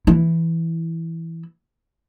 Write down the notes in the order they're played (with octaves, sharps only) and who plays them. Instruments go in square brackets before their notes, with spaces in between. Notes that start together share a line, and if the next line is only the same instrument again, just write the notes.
[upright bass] E3 E4